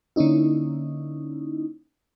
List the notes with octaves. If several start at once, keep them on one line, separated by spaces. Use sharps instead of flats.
D3 A#3 C#4 D#4 E4